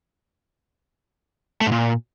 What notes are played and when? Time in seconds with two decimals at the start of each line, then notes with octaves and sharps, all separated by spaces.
1.61 A3
1.66 G#2
1.72 A#2